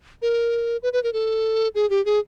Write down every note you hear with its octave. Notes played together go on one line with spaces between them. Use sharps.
A#4
B4
B4
A#4
A4
G#4
G4
G#4